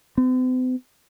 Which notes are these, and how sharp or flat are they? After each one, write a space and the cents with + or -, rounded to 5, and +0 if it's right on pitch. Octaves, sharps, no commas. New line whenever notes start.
C4 -45